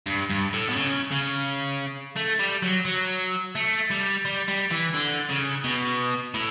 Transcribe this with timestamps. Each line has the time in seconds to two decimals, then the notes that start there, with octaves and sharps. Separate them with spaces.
0.07 G2
0.30 G2
0.53 A2
0.69 B2
0.76 C#3
1.11 C#3
2.16 A3
2.39 G3
2.63 F#3
2.85 F#3
3.55 A3
3.90 G3
4.25 G3
4.48 G3
4.71 E3
4.94 D3
5.30 C#3
5.64 B2
6.34 A2